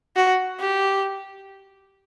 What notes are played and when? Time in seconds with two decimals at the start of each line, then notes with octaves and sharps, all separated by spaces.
0.16 F#4
0.60 G4